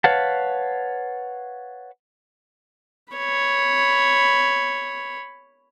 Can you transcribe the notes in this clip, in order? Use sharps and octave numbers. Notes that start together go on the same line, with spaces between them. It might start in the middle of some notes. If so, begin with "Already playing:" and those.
B4 C#5 F5 F#5 A5
C#5 B5